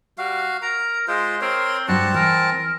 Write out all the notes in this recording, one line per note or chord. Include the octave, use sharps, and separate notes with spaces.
G3 F#4 F5
A#4 A#5
G#3 F4 C5
C4 A#4 C#5 C6
G2 G3 C4 F#4 A5
E3 A#4